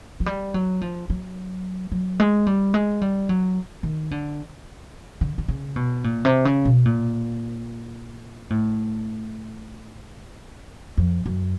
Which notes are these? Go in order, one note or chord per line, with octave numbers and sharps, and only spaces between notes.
F#3
G3
F#3
F3
F#3
F#3
G#3
G3
G#3
G3
F#3
D#3
D3
D3
D3
C#3
B2
A#2
C3
C#3
B2
A#2
A2
F2
F#2